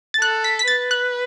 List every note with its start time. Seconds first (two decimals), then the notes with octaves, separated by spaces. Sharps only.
0.14 A6
0.21 A4 F#6
0.44 B6
0.59 B6
0.67 B4 A6
0.91 F#6